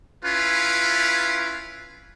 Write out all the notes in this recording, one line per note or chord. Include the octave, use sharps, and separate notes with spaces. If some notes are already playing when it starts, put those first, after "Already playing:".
C#4 E4 F4 B4